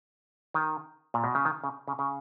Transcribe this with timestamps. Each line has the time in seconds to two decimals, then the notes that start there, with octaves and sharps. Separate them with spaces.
0.54 D#3
1.14 A#2
1.24 B2
1.35 C#3
1.45 D#3
1.64 C#3
1.88 C#3
1.99 C#3